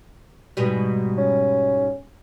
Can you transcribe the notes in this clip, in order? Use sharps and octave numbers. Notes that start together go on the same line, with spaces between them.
G#2 B2 G3
C#4